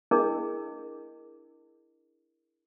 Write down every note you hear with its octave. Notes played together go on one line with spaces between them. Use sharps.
D4 E4 G#4 A#4 D#5